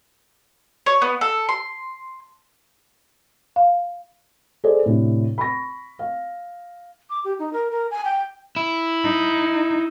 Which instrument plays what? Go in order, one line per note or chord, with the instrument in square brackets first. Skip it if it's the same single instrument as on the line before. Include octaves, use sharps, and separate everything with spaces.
[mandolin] C#5
B3
A4
C6
[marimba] F5
[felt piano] G#4 A4 C5 D5
A2 C3 D4
B5 C#6 A#6
F5
[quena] D6
G4
D#4
A#4
A#4
G#5
G5
[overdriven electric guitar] E4
[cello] D#4